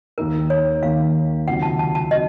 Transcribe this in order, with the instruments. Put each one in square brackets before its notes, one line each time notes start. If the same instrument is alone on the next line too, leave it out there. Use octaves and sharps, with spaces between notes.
[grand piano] D#2 D#3 A#3 D#4 [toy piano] A#4
[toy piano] C#5
[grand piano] D#2 D#3 A#3 D#4 [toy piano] F5
[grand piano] C#2 C3 D#3 F#3 [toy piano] F#5
[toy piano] A5
A5
A5
[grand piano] C3 D#3 F#3 [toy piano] D#5